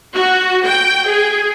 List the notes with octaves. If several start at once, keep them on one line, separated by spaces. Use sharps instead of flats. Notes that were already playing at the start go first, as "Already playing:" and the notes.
F#4
G5
G#4